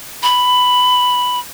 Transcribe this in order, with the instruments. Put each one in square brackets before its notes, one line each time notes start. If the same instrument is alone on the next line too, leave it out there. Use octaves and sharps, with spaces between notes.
[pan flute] B5